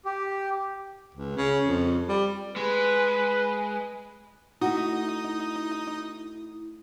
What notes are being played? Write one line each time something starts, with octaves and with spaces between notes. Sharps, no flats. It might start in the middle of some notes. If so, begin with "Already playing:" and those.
G4
C#2
C#3
F2
G3
G#3 B4
A3 D#4 E4 F#4 D#6